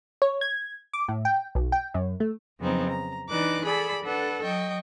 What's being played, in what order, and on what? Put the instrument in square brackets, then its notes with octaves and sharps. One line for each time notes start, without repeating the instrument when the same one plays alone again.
[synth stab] C#5
G#6
D6
A2
G5
B1
G5
F#2
A3
[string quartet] F2 C#3 F#3 B3 C4 D#4
A#5
E3 D4 D#4 B4 D6 F#6
G#4 A4 D5 B5
D4 A4 B4 F#5
F#3 D#5 G5 C#6